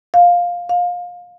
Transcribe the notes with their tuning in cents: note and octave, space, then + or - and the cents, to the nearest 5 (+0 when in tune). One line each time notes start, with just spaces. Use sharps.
F5 +10
F5 +25